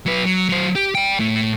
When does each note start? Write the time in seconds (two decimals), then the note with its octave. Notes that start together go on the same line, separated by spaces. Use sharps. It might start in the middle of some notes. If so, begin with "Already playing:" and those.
0.06 F#3 B4
0.25 F#3
0.49 F#3 C5
0.75 G4
0.95 D5 G5
1.19 A2